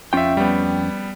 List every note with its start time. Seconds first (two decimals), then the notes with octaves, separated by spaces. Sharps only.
0.13 F2 C#4 F4 E5 G5
0.37 G3 B3